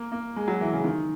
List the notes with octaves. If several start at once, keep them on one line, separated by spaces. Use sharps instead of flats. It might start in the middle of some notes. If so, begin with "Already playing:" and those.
Already playing: A#3
A#3
G#3
F#3
E3
C#3
D#3